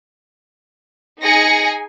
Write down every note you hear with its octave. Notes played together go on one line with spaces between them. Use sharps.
D#4 G#4 G#5 A#6 C#7